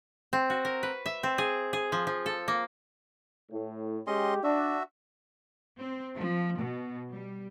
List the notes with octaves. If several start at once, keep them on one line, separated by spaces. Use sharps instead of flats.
C4
F#4
A#4
B4
E5
C4
G#4
G#4
F3
F3
A4
A#3
A2
G#3 C#4 G4 D#5 C6
D4 F#4 E5
C4
F3
B2
G3